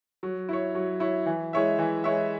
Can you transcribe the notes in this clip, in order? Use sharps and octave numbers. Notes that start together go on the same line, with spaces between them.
F#3
E4 C#5
F#3
E4 C#5
E3
G#3 E4 C#5 E5
E3
G#3 E4 C#5 E5